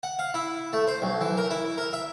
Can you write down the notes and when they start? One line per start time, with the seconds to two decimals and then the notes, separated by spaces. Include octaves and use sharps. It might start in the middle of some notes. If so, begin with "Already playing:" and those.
0.03 F#5
0.19 F5
0.34 E4
0.73 A3
0.87 C5
1.02 B1
1.21 E3
1.37 A#4
1.51 E4
1.78 A#4
1.93 E5